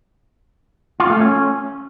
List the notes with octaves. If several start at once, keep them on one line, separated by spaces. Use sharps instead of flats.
F4
A3
C#4